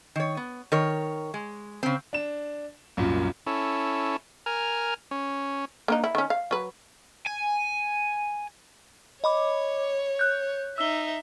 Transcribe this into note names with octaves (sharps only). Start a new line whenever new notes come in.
D#3 C#5
B3
D#3 A#4 C#5
G#3
C#3 C4
D4 E7
C2 F#2 A#2
C#4 E4 A4
A#4 G#5 F6
C#4
A#3 D4 D#4
E4
D#3 C#4
F5
F#3 B4
G#5
C#5 D#5 B5 D6
F#6 G6
D#4 E5 E6 G7